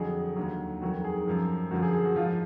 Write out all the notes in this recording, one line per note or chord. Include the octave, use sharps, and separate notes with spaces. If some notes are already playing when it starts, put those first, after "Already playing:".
Already playing: F2 D3 F#3 G#4
D#2 D3 F#3
F2 D#3 F#3 F#4
G#4
F#2 F3
F#2 D3 F3 F#4
G#4
G#4
F#4
G#2 F3 F4